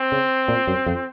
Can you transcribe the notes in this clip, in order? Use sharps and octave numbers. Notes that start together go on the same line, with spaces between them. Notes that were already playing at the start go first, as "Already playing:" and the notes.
Already playing: C4
C#3
A#2
F#2
F2